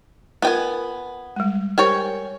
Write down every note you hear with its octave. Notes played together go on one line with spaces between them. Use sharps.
B3 F4 A#4 G5 G#5
G3 G#3
G4 A#4 C5 C#5 G5 G#5